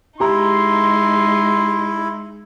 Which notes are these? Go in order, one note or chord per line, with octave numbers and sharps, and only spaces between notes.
G#3 D#4 E4 G4 A#5 C6